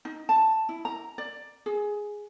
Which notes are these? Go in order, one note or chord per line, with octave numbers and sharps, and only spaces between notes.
D#4
A5
E4
A#5
D5
G#4